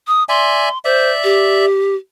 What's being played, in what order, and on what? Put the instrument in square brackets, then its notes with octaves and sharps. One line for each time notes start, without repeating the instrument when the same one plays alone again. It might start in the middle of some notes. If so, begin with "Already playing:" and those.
[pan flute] D#6
[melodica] D5 E5 G#5 [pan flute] C6
[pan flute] C5 [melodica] D5 E5
[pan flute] G4